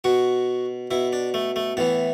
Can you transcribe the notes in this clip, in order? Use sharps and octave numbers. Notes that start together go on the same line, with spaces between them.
B2 F#4
B2 E4
D4
A3
A3
A2 E3 B3